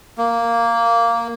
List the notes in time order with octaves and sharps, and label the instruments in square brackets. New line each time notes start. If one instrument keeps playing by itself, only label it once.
[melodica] A#3